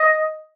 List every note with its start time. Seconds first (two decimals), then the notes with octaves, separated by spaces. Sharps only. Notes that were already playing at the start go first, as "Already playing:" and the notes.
Already playing: D#5